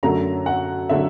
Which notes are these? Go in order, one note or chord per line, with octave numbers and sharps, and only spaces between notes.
F#2 D3 F#3 A3 A#5
F#5
D3 F#3 A3 E5